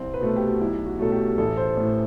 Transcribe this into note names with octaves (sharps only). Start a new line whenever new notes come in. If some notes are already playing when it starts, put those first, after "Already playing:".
Already playing: C2 C4
B4
B2 A3 A4
G4
F#4
B1 E4
F#4
B2 F#3 A3 A4
G4
A1 A4
C5
A2 E3 A3